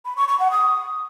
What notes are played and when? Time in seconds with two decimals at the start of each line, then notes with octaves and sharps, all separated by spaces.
0.05 B5
0.17 C#6
0.28 C#6
0.40 F#5
0.51 D#6